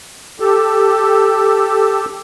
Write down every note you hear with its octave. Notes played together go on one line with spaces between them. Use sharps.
G4 A4